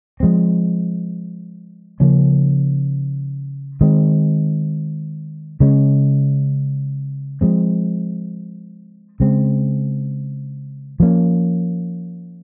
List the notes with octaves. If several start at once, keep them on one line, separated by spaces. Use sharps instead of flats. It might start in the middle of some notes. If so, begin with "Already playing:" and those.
F3 G#3 C4
C#3 F3 A#3 C#4
D#3 G#3 C4
C#3 G#3 C#4
F3 G#3 C4
C#3 G#3 C4
F3 A#3 C#4